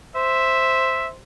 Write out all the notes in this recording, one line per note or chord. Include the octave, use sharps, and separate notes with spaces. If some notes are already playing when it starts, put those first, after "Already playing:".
C5 E5